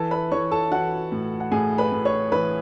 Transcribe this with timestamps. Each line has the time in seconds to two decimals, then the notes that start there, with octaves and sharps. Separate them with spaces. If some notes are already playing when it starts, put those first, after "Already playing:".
Already playing: E3 A4 A5
0.11 B4 B5
0.32 E3 C#5 C#6
0.51 A4 A5
0.72 E3 F#4 F#5
1.12 A2
1.40 F#5
1.51 A2 G#4 G#5
1.78 B4 B5
1.92 A2
2.05 C#5 C#6
2.32 E3 B4 B5